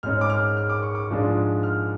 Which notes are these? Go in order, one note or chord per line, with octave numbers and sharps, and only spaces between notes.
G#2 G#3 C#4 F6
D6
F6
F6
D6
C#6
D6
G#2 F3 G#3 D4
F6